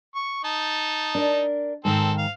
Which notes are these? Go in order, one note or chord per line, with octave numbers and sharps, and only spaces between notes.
C#6
D#4 A5
D4 A#4
G#2 D#3 C4 A4
F5